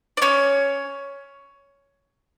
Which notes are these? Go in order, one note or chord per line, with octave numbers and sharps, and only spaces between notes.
D5
C#4 C#5